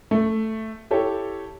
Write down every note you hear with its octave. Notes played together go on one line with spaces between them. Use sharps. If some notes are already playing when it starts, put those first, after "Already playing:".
A3
E4 G4 A4 C#5